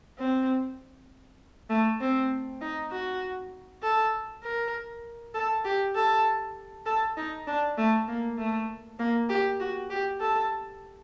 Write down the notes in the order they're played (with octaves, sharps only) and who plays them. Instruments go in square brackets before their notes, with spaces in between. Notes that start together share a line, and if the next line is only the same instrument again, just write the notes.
[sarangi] C4
A3
C4
D#4
F#4
A4
A#4
A4
G4
A4
A4
D#4
D4
A3
A#3
A3
A#3
G4
F#4
G4
A4